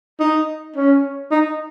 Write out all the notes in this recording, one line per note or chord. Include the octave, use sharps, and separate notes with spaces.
D#4
C#4
D#4